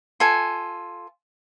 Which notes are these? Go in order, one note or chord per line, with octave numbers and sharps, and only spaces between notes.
F4 A4 G#5